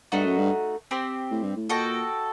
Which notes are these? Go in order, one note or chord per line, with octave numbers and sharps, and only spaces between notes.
G2 A3 D#4 F#4
F#2
G2
C4 G4 C5
A2
G2
A2
A#2 F#4 A4 D#5 G5